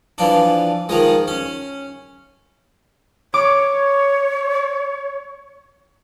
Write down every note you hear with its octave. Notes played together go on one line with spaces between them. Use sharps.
E3 F3 D4
D#3 F3 G#3
C#4
C#5 D6